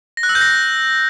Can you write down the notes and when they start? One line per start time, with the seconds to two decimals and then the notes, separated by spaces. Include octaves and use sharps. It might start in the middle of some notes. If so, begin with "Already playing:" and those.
0.17 A#6
0.23 F#6
0.29 E6
0.35 G6
0.41 A#6